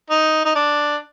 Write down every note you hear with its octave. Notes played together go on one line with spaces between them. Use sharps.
D#4
D#4
D4